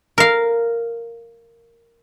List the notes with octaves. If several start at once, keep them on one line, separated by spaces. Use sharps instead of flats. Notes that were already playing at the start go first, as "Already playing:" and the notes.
A#4 F5